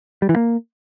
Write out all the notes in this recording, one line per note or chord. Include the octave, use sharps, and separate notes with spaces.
G3
E3
A#3